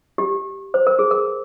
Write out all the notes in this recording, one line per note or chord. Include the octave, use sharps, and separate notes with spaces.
G4
C5
A#4
G#4
A#4